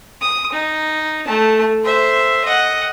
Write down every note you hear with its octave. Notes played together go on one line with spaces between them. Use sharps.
D#6
D#4
A3 A5
C5 E5
D#5 F#5